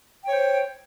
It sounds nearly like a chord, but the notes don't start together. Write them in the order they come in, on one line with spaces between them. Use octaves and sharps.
G5 C#5 C5